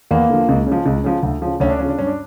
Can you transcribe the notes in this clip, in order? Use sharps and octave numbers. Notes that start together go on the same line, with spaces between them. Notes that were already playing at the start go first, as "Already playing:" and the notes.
E2 A#3
D3 F3
C#2
C#3
F3
C#2
C#3 F3
D2
C#3 F3
D2 C#4
D4
C#3 F3 C#4
D4
G2 C#4
D4